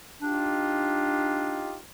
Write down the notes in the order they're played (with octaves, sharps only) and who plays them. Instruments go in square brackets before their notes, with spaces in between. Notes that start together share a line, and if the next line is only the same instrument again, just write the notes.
[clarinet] D4 [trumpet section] D#4 F4 G4